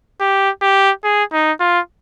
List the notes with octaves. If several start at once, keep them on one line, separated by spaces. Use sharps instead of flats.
G4
G4
G#4
D#4
F4